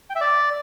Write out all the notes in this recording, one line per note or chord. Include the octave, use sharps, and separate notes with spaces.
G5
E5
D5